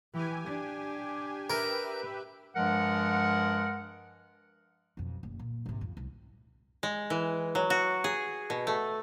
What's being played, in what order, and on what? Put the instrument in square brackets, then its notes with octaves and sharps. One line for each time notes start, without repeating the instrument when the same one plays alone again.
[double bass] E3 [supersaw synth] G4 G#5
[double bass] D4
[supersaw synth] G4 B4 E5 [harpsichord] A#4
[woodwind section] G2 F3 G#3 A#4 F#5
[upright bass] B1 F2
F#1
A#2
G#1 C3
F2
C2
[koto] G#3
E3
F#3
F#4
G#4
B2
A3